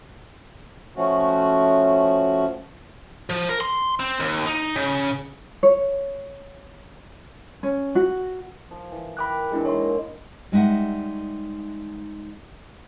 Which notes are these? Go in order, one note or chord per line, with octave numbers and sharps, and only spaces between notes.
F3 A3 C#4 F#4
F3
A#4
C6
C4
D#2
D#4
C#3
C#5
C#4
F#4
F3
E3
A#4 G5 B5 D6 F#6
E3 G#3 D4 E4 G#4
A#3 D#4 E4 C#5 C6
G3 G#3 D#4 E5 F#5